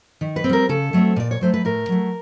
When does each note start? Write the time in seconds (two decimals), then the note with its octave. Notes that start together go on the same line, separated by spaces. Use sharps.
0.21 D#3
0.36 B4
0.44 C4
0.49 G3 A#4
0.69 C#3 A4
0.93 F#3 A3 C4
1.16 A#2 D5
1.31 C#5
1.41 F#3 A3 C5
1.54 B4
1.65 A2 A#4
1.89 F#3 A3